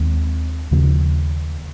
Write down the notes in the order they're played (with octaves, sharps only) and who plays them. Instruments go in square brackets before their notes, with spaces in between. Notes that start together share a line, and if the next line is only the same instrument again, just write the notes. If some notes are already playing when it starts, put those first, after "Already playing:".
Already playing: [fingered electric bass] D#2 D#3 G#3 C4
D#2 C#3 F3 A#3